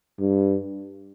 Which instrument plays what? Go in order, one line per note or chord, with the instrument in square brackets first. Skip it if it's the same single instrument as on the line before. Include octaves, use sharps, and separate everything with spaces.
[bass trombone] G2